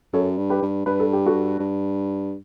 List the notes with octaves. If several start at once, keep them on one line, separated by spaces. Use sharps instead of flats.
F#2 A4 C#5
G2
G4 B4
G2
G2 B4
A4
G4
F#4 A4
G2